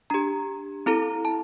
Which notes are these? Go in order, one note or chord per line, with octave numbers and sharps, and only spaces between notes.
D4 G4 A#5
C4 E4 A4 A#5
A5